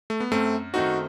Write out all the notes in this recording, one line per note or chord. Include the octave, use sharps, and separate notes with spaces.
A3
B3
F#2 A3 C4
D#3 A3 C4 D#4 F#4